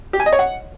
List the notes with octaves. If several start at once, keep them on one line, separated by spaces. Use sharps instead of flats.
G4
G#5
D#5
C#5
F#5